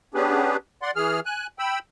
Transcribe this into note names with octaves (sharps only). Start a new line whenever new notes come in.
B3 C#4 D4 G4 G#4 B4
D5 F#5 C6
E3 G#4 F6
G#5 F#6
G5 B5 E6